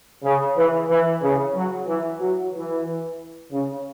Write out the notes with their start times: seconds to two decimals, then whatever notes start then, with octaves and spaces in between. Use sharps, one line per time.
0.24 C#3
0.56 E3
0.90 E3
1.22 C#3
1.55 F#3
1.87 E3
2.20 F#3
2.54 E3
3.52 C#3